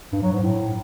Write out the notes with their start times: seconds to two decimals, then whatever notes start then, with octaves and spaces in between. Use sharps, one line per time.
0.13 G2
0.23 F#3
0.32 G#2
0.42 A2